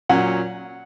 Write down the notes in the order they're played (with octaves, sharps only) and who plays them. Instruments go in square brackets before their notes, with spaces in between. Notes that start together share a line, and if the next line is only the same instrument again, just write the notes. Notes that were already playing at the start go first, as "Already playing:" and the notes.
[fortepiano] A#2 F#3 C#4 F#5